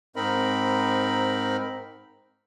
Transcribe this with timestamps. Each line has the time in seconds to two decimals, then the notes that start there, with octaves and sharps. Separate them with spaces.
0.16 G#2 C4 D#4 A#4 B5